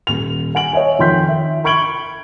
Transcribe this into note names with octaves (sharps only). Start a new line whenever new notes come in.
D#1 F7
F#5 G#5 D7 F#7
C#5 D#5 E5 G#5
F2 D#3 G5 C6 G6 B6
E5
B5 C#6 G#6 D7 F#7 G7